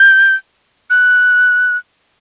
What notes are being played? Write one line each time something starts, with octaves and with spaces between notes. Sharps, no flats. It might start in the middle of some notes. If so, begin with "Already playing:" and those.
Already playing: G6
F#6